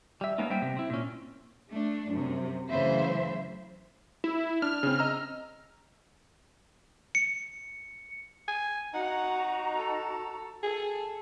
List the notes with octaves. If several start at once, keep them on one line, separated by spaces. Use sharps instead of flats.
G3 E5
G#3 A#3 B3 C#4 D#4
G3 A#3 C5 E5 G5
C3 G4
C4 E4
A#2 C#4
A3 D4
F#2 C3
F#2 C#3 E3 A3 C5 E5
E4
D4 F6
C#3 C4
D#5 A#5 E6
C#7
G#5
D#4 F#4 F#5 A#5
A4
G#4 A4